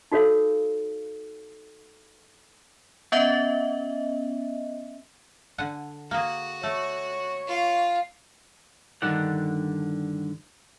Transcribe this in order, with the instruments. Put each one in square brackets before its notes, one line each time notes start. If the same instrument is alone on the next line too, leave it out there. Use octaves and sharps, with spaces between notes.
[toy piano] D#4 F#4 A4 C#5 F5
[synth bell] B3 C#4 D#5 E5
[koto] D3 F#5 G#5
[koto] A#3 G#4 [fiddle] F#4
[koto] A3 [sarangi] C#5
[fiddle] F4 F5
[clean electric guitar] G2 D3 D#3 D5 F#5